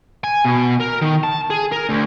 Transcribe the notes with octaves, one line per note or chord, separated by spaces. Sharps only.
G#5
B2
A#4
D#3
A5
G#4
A#4
D2